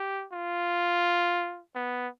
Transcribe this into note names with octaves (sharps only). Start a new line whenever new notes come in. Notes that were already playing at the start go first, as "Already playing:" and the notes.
Already playing: G4
F4
B3